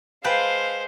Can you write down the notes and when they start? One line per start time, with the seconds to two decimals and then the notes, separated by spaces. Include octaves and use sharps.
0.24 G#3 B4 C5 F5 G5 A5